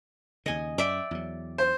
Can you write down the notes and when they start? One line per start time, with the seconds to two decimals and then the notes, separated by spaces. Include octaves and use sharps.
0.46 D#2 C#3 D#5 G#5
0.78 F#2 D5 E5 G5
1.11 E2 F#3
1.58 C5